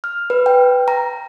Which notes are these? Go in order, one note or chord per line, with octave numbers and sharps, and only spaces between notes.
F6
B4
G5
A#5